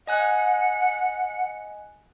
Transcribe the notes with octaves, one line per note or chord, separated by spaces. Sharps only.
D#5 F#5 G#5 F#6